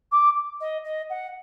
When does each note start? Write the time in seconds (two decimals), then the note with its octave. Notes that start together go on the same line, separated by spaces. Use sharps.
0.12 D6
0.60 D#5
0.84 D#5
1.10 F#5